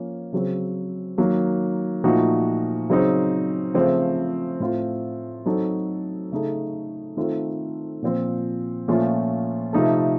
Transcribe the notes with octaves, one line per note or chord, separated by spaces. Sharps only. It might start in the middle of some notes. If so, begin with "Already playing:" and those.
Already playing: F3 A#3 C#4
C#3 F#3 C4
D#3 F#3 A#3
A#2 F3 A3 D#4 F#4
C#3 F#3 C4 D#4
C#3 F3 A3 C4
A2 A3 C4 F4
F#3 C4 D#4 F#4 A4
C#3 A3 D#4 A4
D#3 A3 C4 F4 A4
A#2 F3 C4
A#2 F3 A3 C#4 F4
C3 F3 A3 D#4 A4